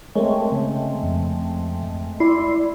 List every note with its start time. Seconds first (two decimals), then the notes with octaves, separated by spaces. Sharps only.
0.15 G#3 A3 C4 G#4 A#4 C#5
0.52 C#3
1.03 F2
2.20 E4 D5 C6